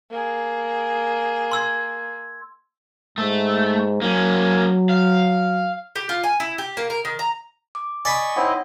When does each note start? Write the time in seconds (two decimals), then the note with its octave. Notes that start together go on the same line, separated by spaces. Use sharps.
0.11 A#3 G#4
1.51 C6 E6 G#6
3.18 G#2 A3
4.02 F#3 A#3 C#4
4.89 F5
5.96 G4
6.09 F4
6.24 G#5
6.40 E4
6.58 G4
6.77 A#3
6.90 A#4
7.05 D#3
7.19 A#5
7.75 D6
8.05 D5 D#5 G#5 B5 C#6
8.36 C4 D#4 E4 C#5 D#5 F#5